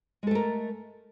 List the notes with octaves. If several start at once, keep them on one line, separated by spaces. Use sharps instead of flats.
G#3 A3 A4 A#4